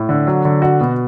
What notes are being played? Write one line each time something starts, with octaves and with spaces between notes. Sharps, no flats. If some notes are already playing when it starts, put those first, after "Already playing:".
Already playing: A2
D3
F#3
D3
F#4
B2